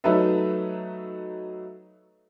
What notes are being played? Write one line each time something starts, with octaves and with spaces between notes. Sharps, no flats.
F#3 A3 D#4 A4 B4 E5